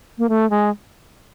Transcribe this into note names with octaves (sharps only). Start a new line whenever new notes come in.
A#3
A3
G#3